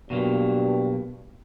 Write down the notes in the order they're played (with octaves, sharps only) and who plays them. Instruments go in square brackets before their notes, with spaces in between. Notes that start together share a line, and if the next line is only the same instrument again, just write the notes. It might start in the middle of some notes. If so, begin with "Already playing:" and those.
[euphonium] G2 [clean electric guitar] B2 F#3 A#3